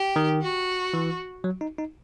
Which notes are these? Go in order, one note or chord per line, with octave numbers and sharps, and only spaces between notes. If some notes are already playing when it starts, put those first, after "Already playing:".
Already playing: G4
D#3
F#4
E3
F#3
D#4
D#4